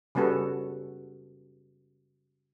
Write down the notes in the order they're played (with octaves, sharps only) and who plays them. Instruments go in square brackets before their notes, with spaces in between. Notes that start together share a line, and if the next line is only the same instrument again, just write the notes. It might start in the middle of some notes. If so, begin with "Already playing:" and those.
[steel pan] C#3 G3 B3 F#4 A4